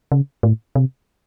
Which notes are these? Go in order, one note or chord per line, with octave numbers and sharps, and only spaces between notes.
C#3
A2
C3